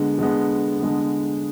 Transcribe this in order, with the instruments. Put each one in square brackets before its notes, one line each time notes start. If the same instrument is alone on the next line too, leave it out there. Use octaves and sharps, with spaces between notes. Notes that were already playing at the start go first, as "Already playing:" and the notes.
Already playing: [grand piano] D3 G#3 B3
D3 G#3 B3
D3 G#3 B3